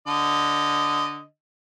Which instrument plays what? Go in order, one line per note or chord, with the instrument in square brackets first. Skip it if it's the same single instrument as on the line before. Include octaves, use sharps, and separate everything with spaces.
[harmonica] D3 D#5